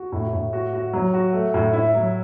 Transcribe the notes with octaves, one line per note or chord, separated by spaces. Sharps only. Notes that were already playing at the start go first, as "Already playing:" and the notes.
Already playing: F#4
A2
A2
F#4
F#4
F#3
F#4
A3
A2
E4
F#3